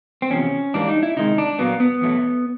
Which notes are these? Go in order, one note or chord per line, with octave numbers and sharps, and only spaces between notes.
C4
E2 C3 F3 C#4
G#2 E3 G3 A#3 D4
D#4
E4
C3 D#3 G#3 D#4
D4
A#2 F#3 A#3 B3
B3
E2 B2 F#3 A3